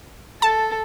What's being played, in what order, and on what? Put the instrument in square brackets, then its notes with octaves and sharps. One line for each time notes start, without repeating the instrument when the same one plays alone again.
[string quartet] A4 [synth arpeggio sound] A5